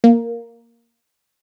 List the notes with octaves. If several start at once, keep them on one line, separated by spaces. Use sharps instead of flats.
A#3